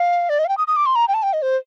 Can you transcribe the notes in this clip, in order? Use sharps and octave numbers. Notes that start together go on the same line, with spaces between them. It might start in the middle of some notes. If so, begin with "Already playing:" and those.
Already playing: F5
D5
D#5
F5
G5
D#6
D#6
D6
C6
A#5
G5
A5
G5
D#5
C5